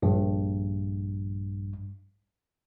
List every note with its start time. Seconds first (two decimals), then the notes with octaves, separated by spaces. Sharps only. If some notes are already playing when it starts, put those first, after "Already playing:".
0.02 A#1 G2